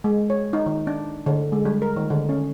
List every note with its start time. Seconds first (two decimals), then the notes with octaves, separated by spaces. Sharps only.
0.04 G#3
0.30 C#5
0.53 D#4
0.66 D#3
0.87 D4
1.26 D3
1.52 G#3
1.65 G3
1.82 A#4
1.96 D#3
2.10 D3
2.29 C#4